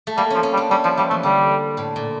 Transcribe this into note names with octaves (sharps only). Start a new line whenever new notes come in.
A3
G3 A#3
F3 C#4
C#4
G3
D4
G3 C#4
F3 E4
F3 G3
E3 A3
D3 G3
A2
A#2